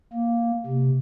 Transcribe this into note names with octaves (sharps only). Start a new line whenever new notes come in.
A#3
C3